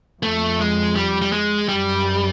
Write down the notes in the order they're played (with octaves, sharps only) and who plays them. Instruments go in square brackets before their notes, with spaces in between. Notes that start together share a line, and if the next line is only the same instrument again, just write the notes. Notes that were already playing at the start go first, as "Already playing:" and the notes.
[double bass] F2 [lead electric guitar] A3
[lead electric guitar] G#3
G3
G3
G#3
[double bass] F#2 [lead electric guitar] G3